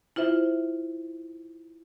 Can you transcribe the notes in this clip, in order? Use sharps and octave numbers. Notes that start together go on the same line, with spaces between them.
E4 F4 C5 E5